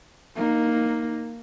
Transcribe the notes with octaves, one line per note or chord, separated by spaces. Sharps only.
A#3 D#4